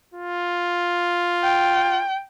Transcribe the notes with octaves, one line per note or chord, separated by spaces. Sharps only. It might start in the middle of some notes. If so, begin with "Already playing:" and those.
F4
G5